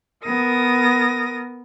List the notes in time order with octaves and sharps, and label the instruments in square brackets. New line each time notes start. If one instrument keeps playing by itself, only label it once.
[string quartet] B3 A#4 D#6 A#6